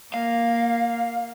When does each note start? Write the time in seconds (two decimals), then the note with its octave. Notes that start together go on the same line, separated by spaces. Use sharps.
0.14 A#3 F5